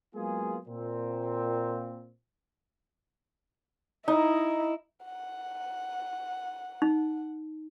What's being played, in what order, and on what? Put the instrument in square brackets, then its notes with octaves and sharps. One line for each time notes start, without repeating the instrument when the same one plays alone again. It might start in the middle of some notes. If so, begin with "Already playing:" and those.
[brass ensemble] F#3 G#3 A#3 B3 F4 G#4
A#2 C4
[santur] D#4 [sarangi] E4
[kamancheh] F#5
[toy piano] D#4